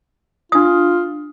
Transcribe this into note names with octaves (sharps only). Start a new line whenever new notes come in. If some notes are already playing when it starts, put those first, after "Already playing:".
D4 F4 D#6